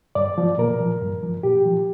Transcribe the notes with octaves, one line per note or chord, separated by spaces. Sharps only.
G2 D5
F3
A#2 A#4
F3
G2
F3
A#2 G4
F3